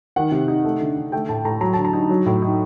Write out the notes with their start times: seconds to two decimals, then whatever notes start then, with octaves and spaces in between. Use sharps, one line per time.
0.16 D#3 F#5
0.32 C3
0.48 D#4
0.65 A3
0.80 D3
0.97 D3
1.12 A3 G5
1.29 A2 A5
1.45 A2 A#5
1.61 F#3 A#5
1.73 D3 A5
1.85 A#5
1.93 D#4
2.09 F#3
2.26 A2
2.42 D#4